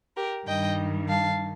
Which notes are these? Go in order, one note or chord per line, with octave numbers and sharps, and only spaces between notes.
G4 A#4
G2 D#3 G3 D#5 G5
F5 A5